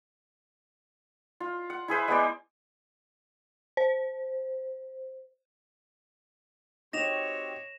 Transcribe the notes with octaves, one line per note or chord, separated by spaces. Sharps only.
F4
F#5
E4 G#4 B4 C5
G#3 B3 C5 D5
C5
C4 D#4 F#4 G4 C#5 A#6 E7 F7